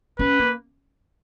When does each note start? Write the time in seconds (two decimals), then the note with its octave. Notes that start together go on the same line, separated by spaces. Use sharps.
0.19 C#4 B4
0.39 A#3